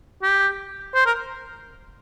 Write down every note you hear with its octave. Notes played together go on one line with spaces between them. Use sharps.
G4
C5
A#4